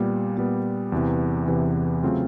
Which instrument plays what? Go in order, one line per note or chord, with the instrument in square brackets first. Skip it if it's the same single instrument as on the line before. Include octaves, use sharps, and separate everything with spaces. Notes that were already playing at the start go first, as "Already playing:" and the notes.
Already playing: [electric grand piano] A#2 G3 B3
A#2 G3 B3
E2 C3 E3
E2 C3 E3
C#3 F#3 A3 C4 F4